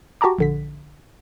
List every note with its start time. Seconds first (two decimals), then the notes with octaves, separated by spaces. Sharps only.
0.21 F#4 G4 A5 A#5 D6
0.39 A#1 D3 B6